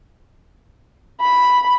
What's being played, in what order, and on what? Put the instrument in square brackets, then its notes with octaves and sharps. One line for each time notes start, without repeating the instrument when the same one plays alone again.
[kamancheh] B5